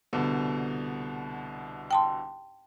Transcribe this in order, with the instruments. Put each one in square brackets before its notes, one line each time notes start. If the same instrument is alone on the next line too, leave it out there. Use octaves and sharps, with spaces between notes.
[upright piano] C2 B2 D3
[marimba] G5 A5 C6